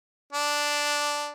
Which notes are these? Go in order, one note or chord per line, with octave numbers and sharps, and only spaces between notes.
D4